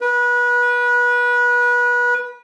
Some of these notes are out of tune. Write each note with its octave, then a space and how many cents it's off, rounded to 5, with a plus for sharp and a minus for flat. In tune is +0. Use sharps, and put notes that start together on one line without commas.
B4 -25